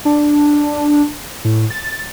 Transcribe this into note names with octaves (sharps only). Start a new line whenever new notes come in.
D4
A2
A6